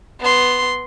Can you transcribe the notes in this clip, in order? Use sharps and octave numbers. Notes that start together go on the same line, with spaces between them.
B3 C6